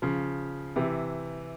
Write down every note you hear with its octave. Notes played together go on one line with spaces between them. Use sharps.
C#3 F3
C3 E3